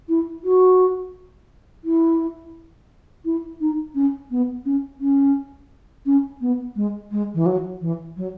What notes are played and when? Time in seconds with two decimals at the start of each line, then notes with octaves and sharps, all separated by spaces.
0.09 E4
0.44 F#4
1.84 E4
3.25 E4
3.61 D#4
3.95 C#4
4.31 B3
4.65 C#4
5.00 C#4
6.06 C#4
6.41 B3
6.76 G#3
7.11 G#3
7.34 E3
7.46 F#3
7.81 E3
8.17 F#3